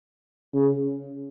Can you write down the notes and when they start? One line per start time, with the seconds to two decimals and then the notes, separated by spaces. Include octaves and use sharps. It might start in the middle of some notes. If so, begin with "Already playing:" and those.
0.54 C#3